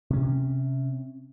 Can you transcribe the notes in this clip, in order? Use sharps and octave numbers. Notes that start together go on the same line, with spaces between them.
C3 C#4